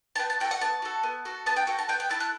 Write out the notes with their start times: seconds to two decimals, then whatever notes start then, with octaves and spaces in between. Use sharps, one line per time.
0.16 A5
0.19 B3 G5
0.30 A5
0.40 F#4 G5
0.45 A4
0.51 F#5
0.61 B3 A5
0.82 F#4 A4
1.03 B3
1.25 F#4 A4
1.46 B3 A5
1.56 G5
1.67 F#4 A4 G5
1.79 A5
1.89 B3 G5
2.00 G5
2.09 E4 A4 A5
2.20 F#6